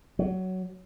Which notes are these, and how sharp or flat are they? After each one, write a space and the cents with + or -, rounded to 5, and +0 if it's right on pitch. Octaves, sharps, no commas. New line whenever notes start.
F#3 +10